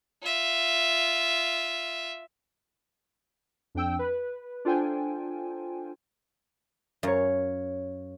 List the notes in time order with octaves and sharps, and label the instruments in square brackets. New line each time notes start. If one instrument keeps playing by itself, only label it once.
[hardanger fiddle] F4 E5
[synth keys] F2 D4 G5 E6
B4
D4 F4 A4 C5 G5 G#5
[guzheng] F#2 [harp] C#5 F5